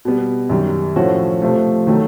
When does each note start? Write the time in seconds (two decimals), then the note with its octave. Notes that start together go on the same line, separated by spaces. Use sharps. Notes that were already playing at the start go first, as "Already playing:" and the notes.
0.05 B2 G3 B3
0.50 F#2 D#3 G3
0.96 A2 F3 A3 C#4 F#4
1.42 C3 F3 A3
1.87 D#3 F#3 A3